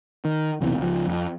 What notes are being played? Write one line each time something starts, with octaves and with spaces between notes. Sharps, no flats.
D#3
B1 E2 C3 E3
C#2 F3
F2